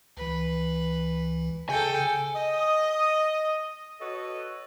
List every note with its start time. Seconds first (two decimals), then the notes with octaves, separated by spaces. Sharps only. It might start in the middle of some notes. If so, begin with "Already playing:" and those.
0.17 C#2 E3 B4
1.69 C#3 G#4 A4 G5 G#5 C#7
2.36 D#5
4.00 F#4 A4 B4 C#5 D#5